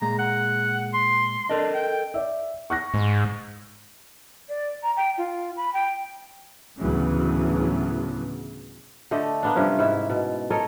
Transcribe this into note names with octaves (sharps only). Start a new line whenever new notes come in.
A#2 G#3 A#5
F#5
C6
D4 A4 A#4 D#5
G5
D5 E5
C#6 F#6 A#6
G#2
D5
A#5
G5
F4
B5
G5
D2 A2 C#3 E3 F#3 B3
D3 A3 G4 D#5
A#3 B3 D4
G2 C3 F3 C#4
G#2 E4 E5
B2
A4 A#4 C#5 D#5